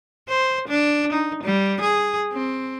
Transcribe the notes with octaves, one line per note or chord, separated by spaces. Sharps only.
C5
D4
D#4
G3
G#4
C4